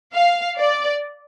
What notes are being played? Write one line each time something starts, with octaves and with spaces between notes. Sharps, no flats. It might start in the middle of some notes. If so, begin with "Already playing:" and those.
F5
D5